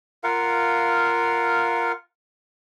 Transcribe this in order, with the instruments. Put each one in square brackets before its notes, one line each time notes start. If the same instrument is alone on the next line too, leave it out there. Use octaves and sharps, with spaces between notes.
[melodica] F4 A#4 F5 F#5